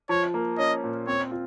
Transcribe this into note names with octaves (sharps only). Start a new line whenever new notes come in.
F3 C#5
A#3
C#4 D#5
A#2
C4 C#5
F4